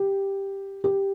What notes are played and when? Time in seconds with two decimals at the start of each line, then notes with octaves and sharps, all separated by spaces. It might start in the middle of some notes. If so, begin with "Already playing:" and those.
Already playing: G4
0.84 G4